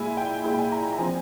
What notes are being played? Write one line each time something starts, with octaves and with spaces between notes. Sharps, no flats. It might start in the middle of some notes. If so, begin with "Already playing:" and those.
Already playing: A#2 G#3 E4 G#5
G5
A#2 G#3 E4 G#5
G#5
A#5
A#5
F3 C4 F4 G#5